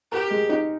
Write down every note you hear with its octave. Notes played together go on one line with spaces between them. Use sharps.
G4 A#4
G#3
D#4